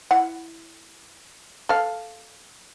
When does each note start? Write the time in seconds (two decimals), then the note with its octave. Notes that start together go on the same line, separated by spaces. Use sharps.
0.11 E4 F#5
1.69 A4 F5